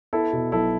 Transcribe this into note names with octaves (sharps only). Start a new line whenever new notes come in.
B3 E4 A4
B2
B1 E4 A4